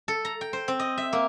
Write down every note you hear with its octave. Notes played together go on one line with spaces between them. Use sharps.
A4
A#5
G5
C5
C4
D#5
E5
A#3